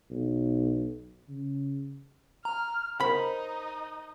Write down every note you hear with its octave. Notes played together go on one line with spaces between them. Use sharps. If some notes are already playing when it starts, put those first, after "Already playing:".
B1
C#3
A#5 F6
D#4 A#4 C5 B5